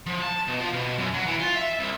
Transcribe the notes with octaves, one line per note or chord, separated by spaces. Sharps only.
F3
A5
B2
F3
B2
F#2
F#3
E3
F4
E5
C2